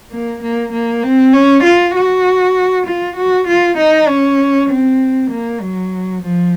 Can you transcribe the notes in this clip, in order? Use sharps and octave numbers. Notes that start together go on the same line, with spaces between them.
A#3
A#3
A#3
C4
C#4
F4
F#4
F4
F#4
F4
D#4
C#4
C4
A#3
F#3
F3